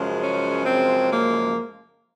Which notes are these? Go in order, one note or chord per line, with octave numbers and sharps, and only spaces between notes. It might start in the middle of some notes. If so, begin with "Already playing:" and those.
Already playing: F#2 C#3 F3 G#3
C#4
C4
A#3